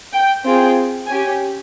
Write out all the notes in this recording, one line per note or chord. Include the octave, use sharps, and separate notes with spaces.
G5
C4 F4 G#4 G5
C#4 G4 G#5